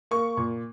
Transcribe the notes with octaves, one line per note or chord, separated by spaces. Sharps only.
A#3 C#6
A#2